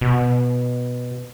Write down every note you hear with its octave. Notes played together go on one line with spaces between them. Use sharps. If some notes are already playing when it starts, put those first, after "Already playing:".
B2